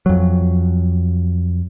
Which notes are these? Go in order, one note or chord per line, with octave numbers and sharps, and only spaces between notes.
F2 F#3